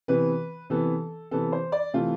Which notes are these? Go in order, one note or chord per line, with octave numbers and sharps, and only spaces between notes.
C3 E3 B3 B4
C3 E3 B3 A4
C3 E3 B3 A4
C5
D5
C3 E3 A3 F4